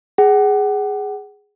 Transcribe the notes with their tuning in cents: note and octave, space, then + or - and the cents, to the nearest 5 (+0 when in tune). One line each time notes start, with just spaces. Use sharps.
G#4 +0 F#5 +30